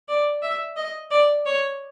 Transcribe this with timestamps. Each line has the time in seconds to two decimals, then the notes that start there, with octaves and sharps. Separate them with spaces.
0.08 D5
0.42 E5
0.77 D#5
1.11 D5
1.46 C#5